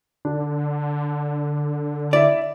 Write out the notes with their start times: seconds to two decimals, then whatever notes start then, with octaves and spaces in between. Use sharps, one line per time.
0.25 D3 D4
2.13 E4 D5 E5